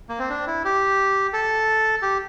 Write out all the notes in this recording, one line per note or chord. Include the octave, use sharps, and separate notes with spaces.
A#3
C4
D4
E4
G4
A4
G4